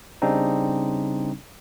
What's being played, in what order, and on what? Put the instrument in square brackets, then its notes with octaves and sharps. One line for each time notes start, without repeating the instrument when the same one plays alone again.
[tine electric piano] C#3 G3 C4 D4 D#4